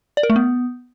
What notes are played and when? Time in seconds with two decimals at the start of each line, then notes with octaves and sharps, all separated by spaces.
0.17 D5
0.23 A#4
0.30 A3
0.36 B3